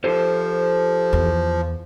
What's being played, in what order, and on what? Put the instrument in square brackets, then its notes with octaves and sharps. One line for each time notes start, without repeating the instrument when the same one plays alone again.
[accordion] F3 [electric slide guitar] G4 A4 C5
[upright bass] E2